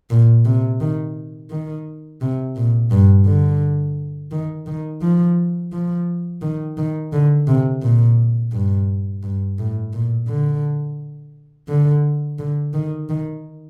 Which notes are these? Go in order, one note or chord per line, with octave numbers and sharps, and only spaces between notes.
A#2
C3
D#3
D#3
C3
A#2
G2
D3
D#3
D#3
F3
F3
D#3
D#3
D3
C3
A#2
G2
G2
A2
A#2
D3
D3
D3
D#3
D#3